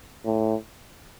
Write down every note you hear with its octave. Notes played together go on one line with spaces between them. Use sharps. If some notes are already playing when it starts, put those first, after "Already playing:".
A2